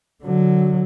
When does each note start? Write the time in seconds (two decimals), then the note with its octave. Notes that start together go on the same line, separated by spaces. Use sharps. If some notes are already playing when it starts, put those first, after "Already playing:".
0.23 D3 F#3